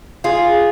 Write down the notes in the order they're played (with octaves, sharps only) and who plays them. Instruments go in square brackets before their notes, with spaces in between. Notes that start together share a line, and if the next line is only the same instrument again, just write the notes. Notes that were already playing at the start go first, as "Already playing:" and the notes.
[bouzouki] F4 G#4